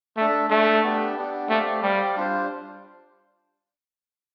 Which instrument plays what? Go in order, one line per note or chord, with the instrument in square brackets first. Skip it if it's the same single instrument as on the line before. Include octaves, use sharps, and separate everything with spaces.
[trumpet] A3 [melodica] D4 A4 E5
[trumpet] A3 [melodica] D4 A4 E5
[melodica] B3 D4 G4
B3 D4 G4
[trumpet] A3 [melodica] C4 G4 D5 F5
[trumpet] G3 [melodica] C4 G4 D5 F5
[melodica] G3 D4 F4 C5